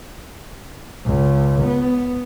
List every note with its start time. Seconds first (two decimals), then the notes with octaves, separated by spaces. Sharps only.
1.04 C#2
1.64 B3